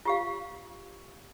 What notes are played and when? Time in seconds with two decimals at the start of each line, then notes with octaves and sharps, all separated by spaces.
0.05 F4 G4 F5